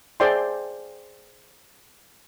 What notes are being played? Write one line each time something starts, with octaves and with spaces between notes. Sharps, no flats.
G#4 C5 D5 E5 G5 C6